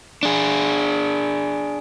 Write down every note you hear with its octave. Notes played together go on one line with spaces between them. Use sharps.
D4 G#4